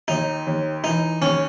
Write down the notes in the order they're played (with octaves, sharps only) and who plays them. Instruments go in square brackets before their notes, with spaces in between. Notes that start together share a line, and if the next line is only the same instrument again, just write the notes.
[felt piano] D#2 [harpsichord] D#4
[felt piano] D#2
[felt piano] E3 [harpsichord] D#4
[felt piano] D#2 [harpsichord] C#4